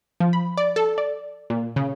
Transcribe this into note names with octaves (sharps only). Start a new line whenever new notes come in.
F3
B5
D5
A4
D5
A#2
C#3